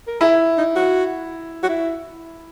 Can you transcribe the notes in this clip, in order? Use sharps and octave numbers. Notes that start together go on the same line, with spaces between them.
A#4
E4 G#4
D#4
F#4
F#4
E4